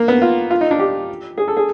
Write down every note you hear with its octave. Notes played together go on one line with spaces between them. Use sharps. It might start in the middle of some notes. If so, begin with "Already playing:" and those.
Already playing: A#3
B3
F4
F4
D#4
D4
G4
G#4
A4
G#4